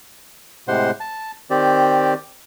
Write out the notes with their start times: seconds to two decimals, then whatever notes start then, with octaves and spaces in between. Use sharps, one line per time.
0.68 A2 C3 G#3 C5 F#5 C6
1.00 A5
1.50 D#3 C4 G4 D5